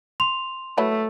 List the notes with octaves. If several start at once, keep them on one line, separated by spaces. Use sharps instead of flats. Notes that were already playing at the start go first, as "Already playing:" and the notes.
C6 F7
F#3 A3 E4 B4